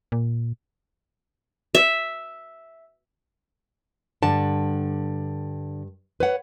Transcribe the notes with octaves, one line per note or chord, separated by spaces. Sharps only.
A#2
E5
G2 D3 A5
B4 C#5 F#5